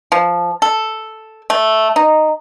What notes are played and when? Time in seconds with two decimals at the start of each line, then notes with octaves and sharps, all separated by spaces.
0.12 F3
0.62 A4
1.50 A3
1.96 D#4